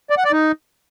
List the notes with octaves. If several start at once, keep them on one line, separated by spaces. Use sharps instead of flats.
D5
F#5
D5
D#4